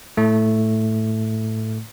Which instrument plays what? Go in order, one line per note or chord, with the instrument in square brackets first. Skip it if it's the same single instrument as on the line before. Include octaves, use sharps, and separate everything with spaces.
[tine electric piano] A2 A3